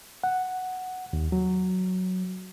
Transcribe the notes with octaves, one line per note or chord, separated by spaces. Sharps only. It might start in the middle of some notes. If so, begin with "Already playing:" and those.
F#5
D#2
F#3